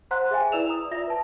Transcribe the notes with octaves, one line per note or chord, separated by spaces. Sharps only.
C5 F#5 A#5 C6 F#6
G#4 E5 F5 G5 G#5
E4 B4 D5 E6 E7 F7
A#5 D#6
F4 D5 E5 A#6
B4 A5